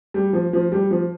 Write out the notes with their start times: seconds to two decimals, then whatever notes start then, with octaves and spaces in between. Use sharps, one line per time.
0.14 G3
0.33 F3
0.53 F3
0.72 G3
0.91 F3